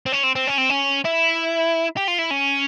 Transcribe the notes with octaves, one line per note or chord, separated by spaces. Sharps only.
C4
C#4
C4
C4
C#4
C4
C#4
E4
G4
F4
E4
C#4